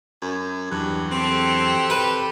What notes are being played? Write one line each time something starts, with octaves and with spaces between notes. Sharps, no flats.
F#2
E2 G2 F#3 F#5
C4 G4 A4
B4